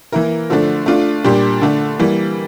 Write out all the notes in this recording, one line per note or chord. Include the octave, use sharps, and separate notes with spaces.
E3 A#3 E4 A#4
D3 F3 A3 D4
A3 D4 F4
A#2 G3 D4 G4
D3 A3 D4
E3 G3 A#3